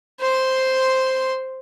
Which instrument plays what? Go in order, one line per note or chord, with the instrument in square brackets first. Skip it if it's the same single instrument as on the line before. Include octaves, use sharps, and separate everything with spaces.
[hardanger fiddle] C5 C6